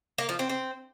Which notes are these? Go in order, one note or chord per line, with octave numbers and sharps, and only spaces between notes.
A#3
F3
C4
C4